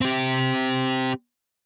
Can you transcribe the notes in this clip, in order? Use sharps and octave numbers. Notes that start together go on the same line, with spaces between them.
C4 G4